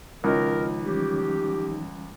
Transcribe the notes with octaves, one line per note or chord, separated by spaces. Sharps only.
C#2 D#3 F3 C#4 D#4 E4 A#4 D#5
E3 G3 C#4 G4